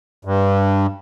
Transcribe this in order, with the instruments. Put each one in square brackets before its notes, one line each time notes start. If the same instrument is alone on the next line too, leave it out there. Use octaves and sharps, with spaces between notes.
[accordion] G2